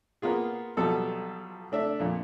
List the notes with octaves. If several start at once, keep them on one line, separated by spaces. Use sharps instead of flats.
A#3 B3 F4 G#4
B1 B2 F3 G3 A4 A5
A3 D4 E5
F2 A#2 D3